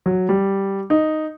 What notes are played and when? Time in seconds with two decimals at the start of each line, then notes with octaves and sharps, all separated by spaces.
0.06 F#3
0.29 G3
0.90 D#4